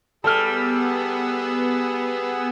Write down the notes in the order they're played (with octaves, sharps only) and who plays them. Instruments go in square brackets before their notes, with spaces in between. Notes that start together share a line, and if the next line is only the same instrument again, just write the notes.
[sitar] G3 [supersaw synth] B3 [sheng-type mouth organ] G#4 B5 E6 [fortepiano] A4 F6